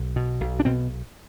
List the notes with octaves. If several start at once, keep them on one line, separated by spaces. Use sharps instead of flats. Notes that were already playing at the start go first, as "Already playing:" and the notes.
Already playing: B1
B2
B1
D4
B2 C4